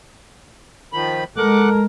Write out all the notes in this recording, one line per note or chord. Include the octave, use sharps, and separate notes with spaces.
D#3 F3 B5
G#3 A4 A#4 F#5 D6 F#6